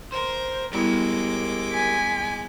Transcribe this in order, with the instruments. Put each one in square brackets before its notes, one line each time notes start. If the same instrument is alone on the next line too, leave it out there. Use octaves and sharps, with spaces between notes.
[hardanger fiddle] A#4 [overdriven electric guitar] C5
[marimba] G3 B3 E4 [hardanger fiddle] G#3 D6 [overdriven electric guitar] G4 A#4
[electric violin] G#5 B6